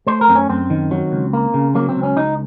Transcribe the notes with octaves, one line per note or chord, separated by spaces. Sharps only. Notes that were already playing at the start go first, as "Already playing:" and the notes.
A3 C5
A#4
F#2 C4
C#4
F#2 C4
D#3
F#3
C#2
A#3
C#3
F#3 A#3
C4
C#2
C#4
C#2 D#4